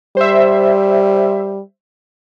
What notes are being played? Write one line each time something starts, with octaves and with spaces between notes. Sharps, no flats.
G3 C5 E5